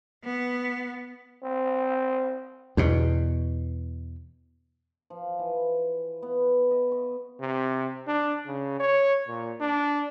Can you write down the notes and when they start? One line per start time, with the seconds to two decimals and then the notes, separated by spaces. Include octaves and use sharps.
0.25 B3
1.43 C4
2.77 E2 B2
5.10 F3
5.39 E3
6.22 B3
6.71 D#5
6.92 C#6
7.40 C3
8.07 D4
8.47 C#3
8.80 C#5
9.28 A#2
9.60 D4